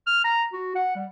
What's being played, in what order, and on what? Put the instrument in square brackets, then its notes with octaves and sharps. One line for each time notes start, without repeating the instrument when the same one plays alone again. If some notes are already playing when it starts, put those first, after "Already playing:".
[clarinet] F6
A#5
F#4
F#5
G3